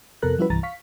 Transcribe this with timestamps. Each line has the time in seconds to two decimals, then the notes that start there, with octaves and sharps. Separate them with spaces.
0.22 F2 C3 B3 A4 A#4 F#6
0.38 F3 G3 C#4 E4 F#4 B4
0.50 C2 G2 E3 A#5 A6
0.63 F5 C#6 B6